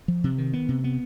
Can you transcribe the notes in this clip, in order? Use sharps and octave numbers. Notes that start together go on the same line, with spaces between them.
F3
C3
D#3
B3
C3
B3